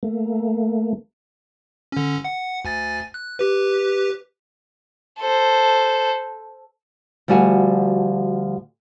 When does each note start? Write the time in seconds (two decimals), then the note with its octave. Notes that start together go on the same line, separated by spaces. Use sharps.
0.03 A3 A#3
1.92 D3 C#4
2.24 F#5
2.65 D2 G#5 A6
3.14 F#6
3.39 G4 B4
5.20 A4 C5
7.28 D2 F3 G3 F#4 G#5